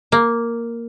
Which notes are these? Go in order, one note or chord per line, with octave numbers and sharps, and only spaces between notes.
A#3